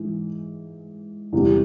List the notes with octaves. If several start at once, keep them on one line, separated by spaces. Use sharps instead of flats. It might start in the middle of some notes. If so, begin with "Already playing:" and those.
Already playing: G#2 E3
E2 C3 E3 G3